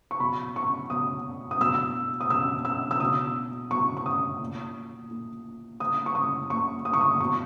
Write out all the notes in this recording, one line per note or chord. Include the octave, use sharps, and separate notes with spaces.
C#6
B2 B5
C#6
B2 D#6
D#6
B2 E6
D#6
B2 E6
E6
E6
B2 D#6
B2 C#6
C#6
D#6
A#2
A#2
A#2 D#6
C#6
D#6
A#2 C#6
D#6
C#6
D#6
B2 C#6